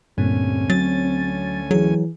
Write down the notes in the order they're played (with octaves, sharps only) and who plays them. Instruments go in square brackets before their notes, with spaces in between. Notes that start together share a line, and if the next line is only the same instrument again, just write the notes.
[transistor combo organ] D2 C#4 G#5 [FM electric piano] G2 A#2 [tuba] C4
[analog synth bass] F#3 [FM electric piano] A6
[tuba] E3 [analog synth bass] F#3 [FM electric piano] G#4